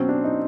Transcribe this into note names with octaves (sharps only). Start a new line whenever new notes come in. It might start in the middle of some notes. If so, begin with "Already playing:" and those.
Already playing: B2 F#3 C4 C#4
D4
D#4